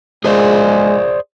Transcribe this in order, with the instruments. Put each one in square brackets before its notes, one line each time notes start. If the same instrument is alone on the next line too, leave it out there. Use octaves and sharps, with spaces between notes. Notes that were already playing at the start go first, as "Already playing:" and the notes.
[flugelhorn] G#3 [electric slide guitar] G#4 C5 D5